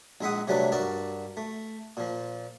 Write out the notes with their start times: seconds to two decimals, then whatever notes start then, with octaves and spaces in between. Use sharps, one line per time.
0.21 A#1 G#3 E4 E5 F#5 D#6
0.47 C3 F#3 G3 A3 D4 B4
0.72 G2 F#4 A#4 D5 A5
1.37 A3
1.97 A#2 F3